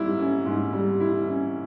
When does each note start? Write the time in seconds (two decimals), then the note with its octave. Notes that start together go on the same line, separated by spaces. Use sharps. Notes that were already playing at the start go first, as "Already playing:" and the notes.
Already playing: G#2 G3 E4
0.19 C#4
0.46 G#2
0.73 G3
1.00 E4
1.28 C#4